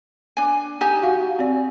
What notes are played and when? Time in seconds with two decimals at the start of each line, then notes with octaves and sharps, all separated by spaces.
0.37 D4 G#5
0.81 D#4 G4 G#5
1.03 F#4 F5 F#5
1.39 C4 D5